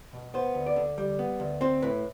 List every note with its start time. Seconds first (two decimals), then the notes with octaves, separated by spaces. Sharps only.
0.13 B2
0.34 B3 C5
0.55 D2
0.66 D5
0.76 D3
0.98 G3
1.19 B3
1.40 D2
1.61 C4 C5
1.82 A2 B4